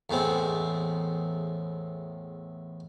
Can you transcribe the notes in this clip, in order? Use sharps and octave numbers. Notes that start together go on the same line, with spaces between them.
E2 A2 G#3 C4